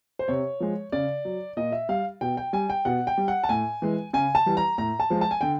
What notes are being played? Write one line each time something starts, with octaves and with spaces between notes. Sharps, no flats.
C5
C3 C#5
F3 G#3
C#3 D5
F#3
A#2 D#5
E5
G3 F5
B2 G5
G5
G3 G#5
G5
B2 F#5
G5
G3
F#5
A5
A2 G#5
E3 G#3
C#3 G#5
A5
E3 G3
A#5
A2 A#5
A5
F3 G#3
A5
G#5
D3 G5